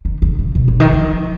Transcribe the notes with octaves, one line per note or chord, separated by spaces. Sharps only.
D#3
D#3
C#3
B2
C#3
D#3
F3